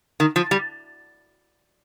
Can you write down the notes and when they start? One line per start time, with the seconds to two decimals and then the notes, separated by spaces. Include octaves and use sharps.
0.20 D#3
0.36 F3
0.51 G3